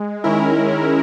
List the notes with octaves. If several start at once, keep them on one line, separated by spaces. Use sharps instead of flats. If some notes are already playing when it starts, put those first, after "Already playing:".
Already playing: G#3
D#3 G#3 C#4 E4 A#4